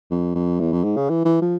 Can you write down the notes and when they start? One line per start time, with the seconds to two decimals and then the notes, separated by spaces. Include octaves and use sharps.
0.11 F2
0.35 F2
0.60 E2
0.72 F2
0.84 G#2
0.97 C#3
1.10 E3
1.25 E3
1.42 F3